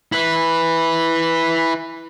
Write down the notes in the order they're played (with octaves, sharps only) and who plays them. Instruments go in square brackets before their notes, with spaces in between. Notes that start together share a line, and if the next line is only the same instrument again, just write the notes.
[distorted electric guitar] E4 B4